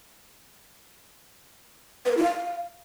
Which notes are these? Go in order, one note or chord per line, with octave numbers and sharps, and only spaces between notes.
B4
A#4
E4
F5